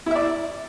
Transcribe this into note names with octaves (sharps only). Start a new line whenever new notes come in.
E4 D5 E5